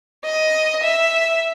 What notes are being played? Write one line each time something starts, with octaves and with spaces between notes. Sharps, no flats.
D#5
E5